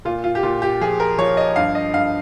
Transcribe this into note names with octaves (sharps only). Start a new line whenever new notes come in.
A#2 F4
F4
G4
A#2 F4
G4
F3 G#4
A#4
F3 C#5
D#5
G2 F5
D#5
G2 F5